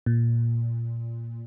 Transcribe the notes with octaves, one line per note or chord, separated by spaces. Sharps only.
A#2